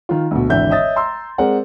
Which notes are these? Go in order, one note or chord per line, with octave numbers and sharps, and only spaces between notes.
D#3 F4
D2 B2
G#1 D3 E3 E5 G6
C#5 D#5 E5 D#6 A6
A#5 C6 E6
G#3 C4 A#4 D5 F#5